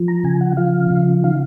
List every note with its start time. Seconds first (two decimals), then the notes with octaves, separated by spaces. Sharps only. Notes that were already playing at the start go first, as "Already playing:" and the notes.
Already playing: F3
0.08 A#5
0.24 C#3 G#5
0.41 F#5
0.57 F3 F5
0.91 C#3
1.24 D#3 F5